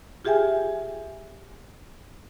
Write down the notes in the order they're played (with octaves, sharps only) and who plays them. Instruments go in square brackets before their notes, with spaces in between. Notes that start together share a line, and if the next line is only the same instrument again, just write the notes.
[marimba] F4 G4 G#4 E5 G5 G#5